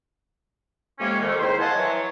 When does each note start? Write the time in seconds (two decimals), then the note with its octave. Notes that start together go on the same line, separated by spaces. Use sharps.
0.99 F2 C3 G#3 A#3 C#4
1.20 F2 D#3 A3
1.39 C#2 D#3 E4 C5
1.60 C5 D#5 F5 F#5 G#5 A5
1.74 E3 F#3 C#5